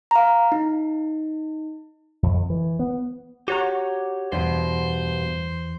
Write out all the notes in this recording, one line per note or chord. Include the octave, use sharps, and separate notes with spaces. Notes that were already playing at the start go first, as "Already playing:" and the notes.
F5 A#5
D#4
F2
E3
B3
F#4 G4 C#5 A#5
E2 G2 B2 E3 C5